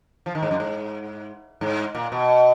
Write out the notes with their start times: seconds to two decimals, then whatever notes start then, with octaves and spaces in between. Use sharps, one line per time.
0.26 F3
0.35 D#3
0.43 G#2
0.51 F#2
0.60 G#2
1.61 G#2
1.95 A#2
2.12 B2